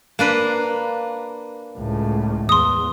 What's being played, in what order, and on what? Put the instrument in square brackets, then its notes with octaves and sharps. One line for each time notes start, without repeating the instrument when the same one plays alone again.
[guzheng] A#3 D4 B4
[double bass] C#2 A2
[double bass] E2 [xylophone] C6 D#6